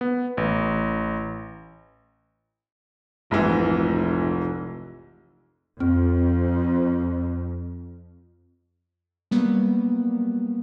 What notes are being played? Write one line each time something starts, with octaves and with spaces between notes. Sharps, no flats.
B3
A1
F1 A#1 G#2 E3
F2 C4
F#3 G3 A#3 B3